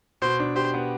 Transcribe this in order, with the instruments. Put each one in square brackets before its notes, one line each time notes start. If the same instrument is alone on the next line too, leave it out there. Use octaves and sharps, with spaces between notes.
[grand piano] B2 [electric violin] C5
[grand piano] D4
[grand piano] G4 [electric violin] C5
[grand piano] B3